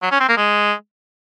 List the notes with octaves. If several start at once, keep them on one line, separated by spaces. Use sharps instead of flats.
F#3
C#4
C4
A#3
G#3